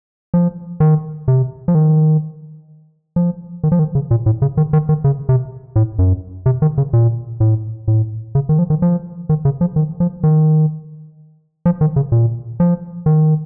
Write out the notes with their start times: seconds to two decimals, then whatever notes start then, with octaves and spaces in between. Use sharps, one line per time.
0.34 F3
0.80 D#3
1.28 C3
1.68 F3
1.75 D#3
3.16 F3
3.64 D#3
3.72 F3
3.79 D#3
3.95 C#3
4.11 A#2
4.26 A2
4.42 C#3
4.57 D#3
4.73 D#3
4.89 D#3
5.04 C#3
5.29 C3
5.76 A2
5.99 F#2
6.46 C3
6.62 D#3
6.78 C#3
6.93 A#2
7.40 A2
7.88 A2
8.35 C#3
8.49 D#3
8.59 F3
8.70 D#3
8.82 F3
9.29 D#3
9.45 C#3
9.61 F3
9.76 D#3
10.00 F3
10.23 D#3
11.66 F3
11.81 D#3
11.96 C#3
12.12 A#2
12.60 F3
13.06 D#3